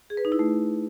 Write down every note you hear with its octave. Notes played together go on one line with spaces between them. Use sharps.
G#4
B4
D#4
E4
A3